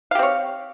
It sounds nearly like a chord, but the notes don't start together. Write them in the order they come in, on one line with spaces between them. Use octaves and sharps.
F5 G4 C4 C#5